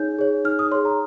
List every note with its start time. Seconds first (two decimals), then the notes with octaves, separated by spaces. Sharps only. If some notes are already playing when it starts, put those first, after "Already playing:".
Already playing: D#4 G#4 C#5 G6
0.19 G#4 C#5
0.45 D#4 F6
0.59 D#6
0.71 G#4 C#5 C6
0.85 A#5